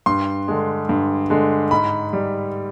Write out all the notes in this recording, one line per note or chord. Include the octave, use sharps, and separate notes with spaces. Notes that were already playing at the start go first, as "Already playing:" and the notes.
G2 C6
D3 G#3
G2
D3 G#3
G#2 B5
G3